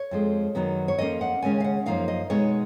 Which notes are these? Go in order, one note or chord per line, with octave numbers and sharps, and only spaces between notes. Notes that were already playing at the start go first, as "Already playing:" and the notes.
Already playing: C#5
F2 F3 G#3
F#2 D#3 F#3 B3
C#5
F2 F3 A#3 C#4 D#5
F#5
D#2 C#3 G#3 C#4 G#5
F5
F#5
F#2 F3 A#3 D#4 F5
D#5
B2 G#3 B3 D#4 C#5